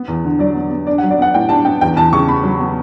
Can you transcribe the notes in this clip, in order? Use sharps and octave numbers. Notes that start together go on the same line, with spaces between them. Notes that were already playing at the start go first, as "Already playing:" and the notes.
Already playing: B3
E2
D3
F#3 D5
B3
B3
D4 D5
F#5
F#3
D5
B3 F#5
A2 G5
D4 A5
B3 G5
E2 G5
E2 A5
C#3 C#6
B3 B5
F#3
B3